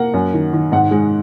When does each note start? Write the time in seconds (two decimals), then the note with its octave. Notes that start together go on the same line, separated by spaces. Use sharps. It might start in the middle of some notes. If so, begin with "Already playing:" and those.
Already playing: A#3 F#5
0.14 F#2
0.34 D#3
0.53 D#3
0.72 G#2 F#5
0.91 G#3